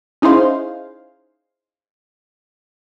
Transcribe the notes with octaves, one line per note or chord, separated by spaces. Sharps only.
C#4 D#4 E4 G#4 C5 F5